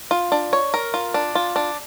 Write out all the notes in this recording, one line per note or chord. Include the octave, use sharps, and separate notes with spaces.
F4
D4
C#5
A#4
F4
D4
F4
D4